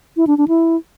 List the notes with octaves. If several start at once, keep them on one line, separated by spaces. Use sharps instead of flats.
E4
D4
D4
E4